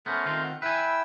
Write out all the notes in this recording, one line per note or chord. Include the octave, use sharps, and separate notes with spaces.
A3 B3 C#4 A#4 C5
D#3 C4 F4
F#5
E4 B4 G5 G#5 E6